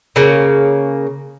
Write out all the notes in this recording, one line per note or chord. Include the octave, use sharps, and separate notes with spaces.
C#3 A#3